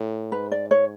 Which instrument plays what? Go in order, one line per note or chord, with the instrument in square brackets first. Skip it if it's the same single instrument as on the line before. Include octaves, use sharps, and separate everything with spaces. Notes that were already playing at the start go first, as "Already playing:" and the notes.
Already playing: [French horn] A2
[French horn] G#2 [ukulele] B4
[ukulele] D5
C#5